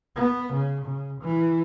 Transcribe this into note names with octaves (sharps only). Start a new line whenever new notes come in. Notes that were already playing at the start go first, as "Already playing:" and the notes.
B3
C#3
C#3
E3